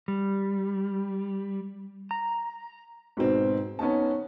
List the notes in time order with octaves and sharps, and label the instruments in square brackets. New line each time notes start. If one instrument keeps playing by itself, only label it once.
[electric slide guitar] G3
A#5
[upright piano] G#2 B2 C4
B3 C#4 D#4 A5